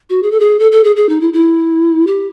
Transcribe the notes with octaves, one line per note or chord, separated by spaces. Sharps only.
F#4
G#4
A4
G#4
A4
A4
G#4
G#4
D#4
E4
E4
G4